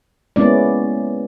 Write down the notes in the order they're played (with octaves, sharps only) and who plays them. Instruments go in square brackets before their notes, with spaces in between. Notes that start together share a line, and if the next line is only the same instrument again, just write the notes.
[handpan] G#3 A#3 B3 C#4 E4 D5